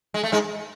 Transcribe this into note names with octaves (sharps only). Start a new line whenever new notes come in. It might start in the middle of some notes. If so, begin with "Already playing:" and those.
G#3
A3
G#2 G#3